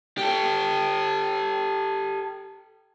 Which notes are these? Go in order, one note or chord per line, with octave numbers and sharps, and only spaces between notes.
G4 A4